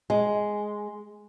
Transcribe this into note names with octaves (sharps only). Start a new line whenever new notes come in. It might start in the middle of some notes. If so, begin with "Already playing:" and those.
G#3